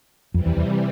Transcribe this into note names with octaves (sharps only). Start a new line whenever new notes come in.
F2 C3 E3 G3
E2
E2